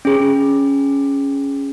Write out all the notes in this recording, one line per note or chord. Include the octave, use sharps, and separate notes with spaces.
C#4 G#4